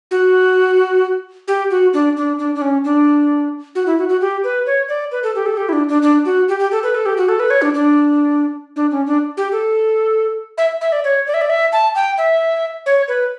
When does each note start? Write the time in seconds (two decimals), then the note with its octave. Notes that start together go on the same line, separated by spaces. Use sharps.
0.11 F#4
1.48 G4
1.71 F#4
1.94 D4
2.17 D4
2.39 D4
2.55 D4
2.62 C#4
2.84 D4
3.75 F#4
3.87 E4
3.98 F#4
4.09 F#4
4.21 G4
4.44 B4
4.66 C#5
4.89 D5
5.12 B4
5.23 A4
5.35 G4
5.46 A4
5.57 G4
5.69 E4
5.73 D4
5.88 D4
6.02 D4
6.25 F#4
6.49 G4
6.60 G4
6.72 A4
6.83 B4
6.95 A4
7.06 G4
7.17 F#4
7.29 A4
7.40 B4
7.50 C#5
7.62 D4
7.74 D4
8.76 D4
8.91 C#4
9.07 D4
9.37 G4
9.52 A4
10.58 E5
10.81 E5
10.92 D5
11.04 C#5
11.27 D5
11.34 E5
11.41 D5
11.50 E5
11.73 A5
11.95 G5
12.18 E5
12.86 C#5
13.08 B4